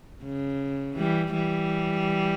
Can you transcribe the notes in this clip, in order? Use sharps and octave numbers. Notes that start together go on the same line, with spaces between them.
C#3
E3 G3
E3 G3